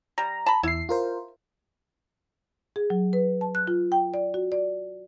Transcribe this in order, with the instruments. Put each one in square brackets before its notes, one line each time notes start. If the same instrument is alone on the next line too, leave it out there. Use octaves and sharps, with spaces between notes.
[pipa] G3 [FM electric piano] A#5
[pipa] A5 B5
[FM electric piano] E2 C7 [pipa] E4
[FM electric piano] F4 A#4 C5
[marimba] G#4
F#3
B4
A5
F#6
F4
G5
D5
F#4
D5